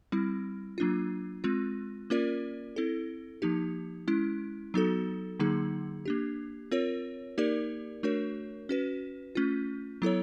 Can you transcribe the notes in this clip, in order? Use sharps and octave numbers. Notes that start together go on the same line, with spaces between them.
G3 C4 E4
F#3 A#3 D4 F4
G#3 C4 F4
A#3 C#4 F4 A#4 D5
C4 E4 A4
F3 A#3 D#4 G4
G#3 C#4 E4
F#3 B3 D#4 F#4 A4
D3 F#3 A#3 D#4 G#4
A#3 D4 G4
C4 F4 A#4 C#5
A#3 D#4 G4 A#4 D5
A3 D4 F#4 A#4 C#5
C#4 F#4 B4
A3 C#4 F4
F#3 B3 E4 A4 C#5